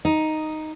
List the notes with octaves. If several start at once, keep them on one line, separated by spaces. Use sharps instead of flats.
D#4